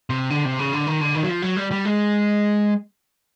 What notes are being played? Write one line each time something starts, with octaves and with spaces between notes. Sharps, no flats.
C3
D3
C3
C#3
D3
D#3
D3
D#3
F#3
F3
F#3
G3
G3
G#3